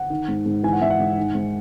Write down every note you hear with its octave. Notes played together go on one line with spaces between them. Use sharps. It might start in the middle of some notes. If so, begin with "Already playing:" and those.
Already playing: F#5
D#3
G#2
G#2
E3 G#5
F#5
G#2 E5
F#5
G#2
D#3
G#2